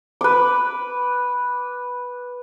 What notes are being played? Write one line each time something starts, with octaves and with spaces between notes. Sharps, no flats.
B4 D6